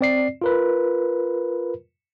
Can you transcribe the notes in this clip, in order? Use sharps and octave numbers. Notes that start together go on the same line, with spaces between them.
C4 D5 C7
F4 A#4 B4